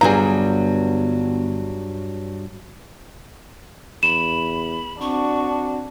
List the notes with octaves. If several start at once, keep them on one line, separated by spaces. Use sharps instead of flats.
G1 G2 F#3 G3 G#4 A#5
E2 B5 E7
C4 D4 F#4 C#6